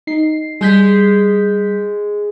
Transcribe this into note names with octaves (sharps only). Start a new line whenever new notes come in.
D#4 C7
G3 G#3 G6 B6